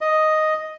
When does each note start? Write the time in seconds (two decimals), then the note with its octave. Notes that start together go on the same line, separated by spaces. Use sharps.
0.01 D#5